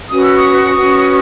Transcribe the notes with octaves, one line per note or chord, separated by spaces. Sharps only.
C#4 F#4 B4 D#6
E6
C#6 D#6
C#4 F#4 B4